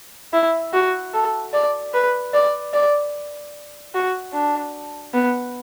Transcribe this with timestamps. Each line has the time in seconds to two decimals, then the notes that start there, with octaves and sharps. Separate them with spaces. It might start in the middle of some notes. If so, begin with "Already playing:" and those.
0.33 E4
0.73 F#4
1.14 A4
1.53 D5
1.94 B4
2.33 D5
2.73 D5
3.94 F#4
4.33 D4
5.14 B3